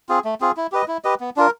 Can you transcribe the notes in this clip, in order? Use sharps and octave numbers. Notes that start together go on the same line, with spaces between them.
C4 F4 G#4
A3
C4 F4 G#4
E4
G4 B4 D#5
E4
G4 B4 D#5
B3
D4 F4 A#4